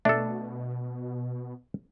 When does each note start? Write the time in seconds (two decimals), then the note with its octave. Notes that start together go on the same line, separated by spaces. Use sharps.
0.05 B2 A3 D4 A4